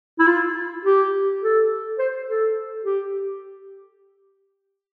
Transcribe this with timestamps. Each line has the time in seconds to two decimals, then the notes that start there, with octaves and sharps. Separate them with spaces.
0.19 E4
0.27 F4
0.85 G4
1.42 A4
1.99 C5
2.28 A4
2.84 G4